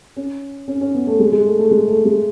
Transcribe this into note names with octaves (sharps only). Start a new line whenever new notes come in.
C#4
C#4
C#4
B3
A3
G#3
G#3
A3
A3
G#3
A3
G#3